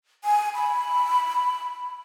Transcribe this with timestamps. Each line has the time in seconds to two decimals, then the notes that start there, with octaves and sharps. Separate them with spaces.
0.24 G#5
0.55 B5